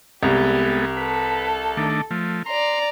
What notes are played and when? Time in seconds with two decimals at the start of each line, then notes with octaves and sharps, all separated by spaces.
0.23 C2 G#3 B3 G4 A4
0.97 A4 B4
1.77 D#3 A3 D4
2.11 F3 A3
2.46 D5 A#5 C6